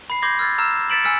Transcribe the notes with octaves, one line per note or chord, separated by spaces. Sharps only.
B5 C7
C6 D6 G6 G#6 A#6 C7
E6 F6 G#6 A6
A#5 E6 F6 E7
A6 B6 C#7 D7 E7 F#7
G#5 E6 F6 B6 C#7